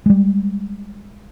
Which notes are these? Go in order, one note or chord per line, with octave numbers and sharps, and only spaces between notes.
G3 G#3